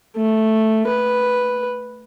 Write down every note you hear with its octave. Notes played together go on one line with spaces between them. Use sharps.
A3
B4